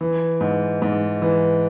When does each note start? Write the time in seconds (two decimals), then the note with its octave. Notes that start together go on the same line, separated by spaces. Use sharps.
0.01 E3
0.41 G#2
0.82 G#2
1.22 E3